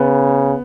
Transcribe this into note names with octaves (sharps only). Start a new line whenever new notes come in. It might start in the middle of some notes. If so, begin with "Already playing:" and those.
Already playing: C#3 B3